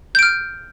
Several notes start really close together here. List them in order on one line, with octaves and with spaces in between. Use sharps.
G6 D7 F6